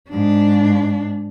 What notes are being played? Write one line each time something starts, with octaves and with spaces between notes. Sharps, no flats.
G#2 D4